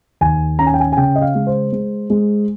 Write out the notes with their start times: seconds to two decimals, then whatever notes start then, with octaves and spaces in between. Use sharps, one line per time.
0.21 D#2 G#5
0.59 C#4 A#5
0.66 G#5
0.74 G5
0.80 G#5
0.92 G#5
0.97 C#3 G5
1.16 D#5
1.22 F5
1.35 G#3
1.47 C5
1.72 G#3
2.10 G#3